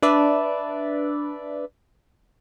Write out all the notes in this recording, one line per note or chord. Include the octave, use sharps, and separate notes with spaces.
D4 B4 D5 E5